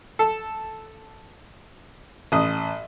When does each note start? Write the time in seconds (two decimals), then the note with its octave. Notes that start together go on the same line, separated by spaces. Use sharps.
0.19 A4
2.32 A1 D#6